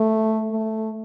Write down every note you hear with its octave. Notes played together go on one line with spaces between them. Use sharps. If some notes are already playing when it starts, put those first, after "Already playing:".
Already playing: A3
A3